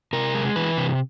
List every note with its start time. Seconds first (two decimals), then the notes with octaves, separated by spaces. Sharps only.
0.13 C3 A#4
0.35 G#3
0.56 E3 B4
0.77 C3